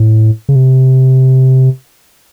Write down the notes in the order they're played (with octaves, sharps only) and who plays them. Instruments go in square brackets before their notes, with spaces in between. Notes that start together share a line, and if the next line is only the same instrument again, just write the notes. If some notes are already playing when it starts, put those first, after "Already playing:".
Already playing: [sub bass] A2
C#3
C3